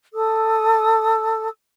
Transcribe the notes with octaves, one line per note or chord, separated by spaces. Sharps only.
A4 D#6 E6